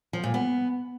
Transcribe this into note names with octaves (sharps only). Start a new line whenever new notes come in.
F3
A#2
B3